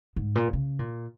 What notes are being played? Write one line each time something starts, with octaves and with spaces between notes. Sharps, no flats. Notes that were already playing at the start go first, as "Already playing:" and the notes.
G#2
A#2
C#3
A#2